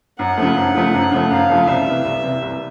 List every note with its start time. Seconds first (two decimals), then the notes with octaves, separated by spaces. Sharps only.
0.19 F#2 F#5
0.37 C#3 F3 A3
0.57 F#2
0.75 C#3 F3 A3
0.94 F#2
1.12 C#3 F3 A3
1.30 F#2 F5
1.50 C#3 F3 A3
1.67 C2 E5
1.86 C3 E3
2.05 C2
2.23 C3 E3
2.42 C2